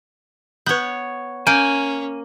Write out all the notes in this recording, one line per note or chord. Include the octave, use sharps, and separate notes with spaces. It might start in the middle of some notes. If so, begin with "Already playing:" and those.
B3 B4 C#5 G6
A#3 C#4 G#5 G6 D7